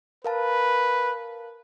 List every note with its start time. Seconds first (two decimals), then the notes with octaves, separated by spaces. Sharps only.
0.24 A#4 B4 F5 A5